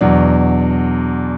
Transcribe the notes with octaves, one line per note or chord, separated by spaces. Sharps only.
E2 B2 F#3 D4